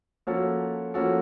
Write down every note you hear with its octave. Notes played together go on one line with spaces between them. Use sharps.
F3 A#3 C#4 F#4 A4
F3 A#3 C#4 F#4 A4